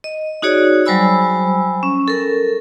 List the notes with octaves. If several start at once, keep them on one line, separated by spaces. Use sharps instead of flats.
D#5
D#4 F#4 G#4 C#5 D5
F#3 G3 C5 G#5 B5 E6
C#4
A4 A#4